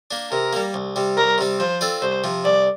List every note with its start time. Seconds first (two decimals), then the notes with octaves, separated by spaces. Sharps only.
0.11 A#3 D4
0.31 C3 A#4
0.53 G3 A#3
0.74 C2
0.96 C3 G3
1.17 C2 A#4
1.38 C3 G3 C4
1.59 F3 C5
1.81 C4 F4 A4 D5
2.02 C2 C5
2.24 C3 F3
2.44 C2 D5